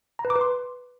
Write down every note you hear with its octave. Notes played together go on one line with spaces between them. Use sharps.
A#5
B4
D6
B4
C6